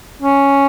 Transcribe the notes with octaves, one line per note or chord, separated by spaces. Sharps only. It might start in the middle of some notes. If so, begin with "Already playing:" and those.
C#4